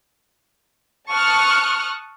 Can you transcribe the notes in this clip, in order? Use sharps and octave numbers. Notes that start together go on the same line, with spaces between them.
A5 C#6 D#6 F6 F#6